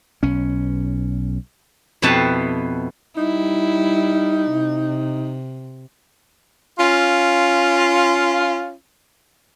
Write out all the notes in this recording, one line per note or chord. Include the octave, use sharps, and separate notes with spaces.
B1 C#4
F2 B2 B3 E4 B4 A5
G3 D#4 E4
C3
C#4 F4